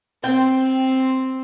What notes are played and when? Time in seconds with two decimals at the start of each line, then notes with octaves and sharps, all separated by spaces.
0.24 C4 G5